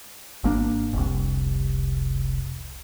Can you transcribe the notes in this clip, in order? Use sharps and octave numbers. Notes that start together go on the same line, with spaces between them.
G#1 A#3 D4
F1 C2